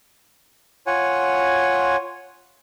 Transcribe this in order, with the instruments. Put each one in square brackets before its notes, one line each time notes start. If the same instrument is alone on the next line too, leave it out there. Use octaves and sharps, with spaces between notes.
[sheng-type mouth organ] F4 C#5 F#5 G#5